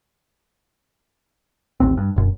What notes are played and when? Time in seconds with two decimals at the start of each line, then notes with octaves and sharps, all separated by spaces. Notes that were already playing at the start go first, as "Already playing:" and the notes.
1.80 A1 D#2 C4
1.97 G2
2.16 E1 F#2